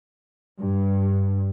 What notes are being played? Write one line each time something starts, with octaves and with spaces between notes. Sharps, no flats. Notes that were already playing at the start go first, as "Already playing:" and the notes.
G2